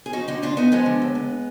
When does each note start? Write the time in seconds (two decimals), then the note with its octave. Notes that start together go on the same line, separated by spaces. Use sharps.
0.06 G#4
0.13 F3 D#4 F#4
0.28 D3 D#4 F#4
0.42 D2 D4 F4
0.57 D2 B3 D#4
0.72 F3 G#3 B3
0.86 D3
1.02 D#2
1.15 D#2